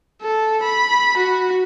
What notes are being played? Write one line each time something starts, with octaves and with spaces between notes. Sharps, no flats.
A4
B5
F#4